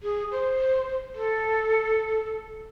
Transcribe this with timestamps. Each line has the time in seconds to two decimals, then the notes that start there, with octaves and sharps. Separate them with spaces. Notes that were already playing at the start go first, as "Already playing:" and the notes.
0.03 G#4
0.32 C5
1.15 A4